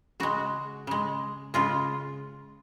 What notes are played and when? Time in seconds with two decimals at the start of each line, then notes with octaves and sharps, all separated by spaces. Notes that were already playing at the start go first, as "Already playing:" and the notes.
0.20 C#3 G#3 F#4
0.87 C#3 G#3
1.54 C#3 G#3 F4